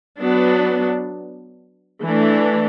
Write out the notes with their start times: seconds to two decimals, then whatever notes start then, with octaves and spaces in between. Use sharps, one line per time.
0.19 F#3 B3 D4
2.02 E3 A3 D4